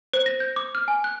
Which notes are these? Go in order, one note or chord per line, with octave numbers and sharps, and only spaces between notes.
C5
A#6
G6
D6
F6
G#5
F#6